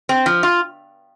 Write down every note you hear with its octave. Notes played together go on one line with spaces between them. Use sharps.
C4
F3
F4